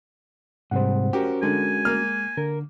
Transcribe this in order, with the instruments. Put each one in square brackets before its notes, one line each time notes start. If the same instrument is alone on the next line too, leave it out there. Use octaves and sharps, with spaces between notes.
[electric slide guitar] G#2 C3 G3 [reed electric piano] C5 F#5
[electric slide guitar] C#4 F#4 A#4 [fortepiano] G4
[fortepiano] D3 [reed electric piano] G#3 [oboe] G#5
[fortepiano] A#3 F6
[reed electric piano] D3 [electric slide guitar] A#4